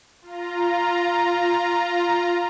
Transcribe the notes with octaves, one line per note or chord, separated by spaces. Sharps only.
F4 A#5